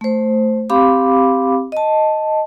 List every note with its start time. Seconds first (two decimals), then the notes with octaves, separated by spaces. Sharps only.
0.01 A3 C5
0.70 C4 G4 F5 B5 D6
1.72 D#5 A5